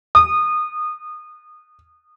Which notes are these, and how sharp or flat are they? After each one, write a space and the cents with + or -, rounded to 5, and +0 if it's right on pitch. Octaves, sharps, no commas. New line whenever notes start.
D#6 -25